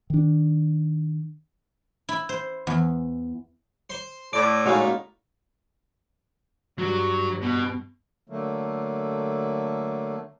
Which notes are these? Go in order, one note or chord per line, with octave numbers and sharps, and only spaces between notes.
D#3 D4
E4
C5
E2
C5 C6
A2 D5 D6
A#2 G#3 C#4 D#4 F#4 G#4 F5
G2 F#3
B2
D3 F#3 A3 A#3